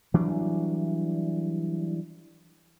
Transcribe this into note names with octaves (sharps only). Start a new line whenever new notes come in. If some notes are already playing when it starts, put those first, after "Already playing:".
E3 F#3 G3 D4